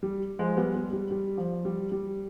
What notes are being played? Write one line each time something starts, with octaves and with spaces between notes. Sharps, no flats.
G3
F3 G#3
G3 B3
G3
G3
G3
F3
G3
G3